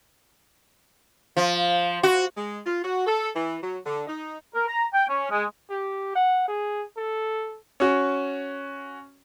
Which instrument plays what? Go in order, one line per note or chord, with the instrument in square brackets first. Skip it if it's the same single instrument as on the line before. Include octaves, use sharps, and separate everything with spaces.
[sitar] F3
F#4
[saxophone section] G#3
F4
F#4
A4
E3
F#3
D3
D#4
[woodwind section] A#4
A#5
G5
C#4
G#3
[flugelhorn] G4
F#5
G#4
A4
[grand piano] C#4 F#4